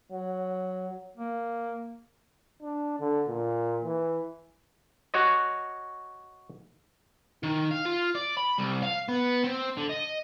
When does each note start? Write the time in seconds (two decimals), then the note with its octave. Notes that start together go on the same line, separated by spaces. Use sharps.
0.12 F#3
1.17 A#3
2.62 D4
2.99 D3
3.28 A#2
3.83 E3
5.14 F#4 C#5 D#5
7.43 D#3
7.71 F5
7.85 F4
8.15 D5
8.37 B5
8.58 C2
8.83 F5
9.08 B3
9.44 C4
9.78 D3
9.90 D#5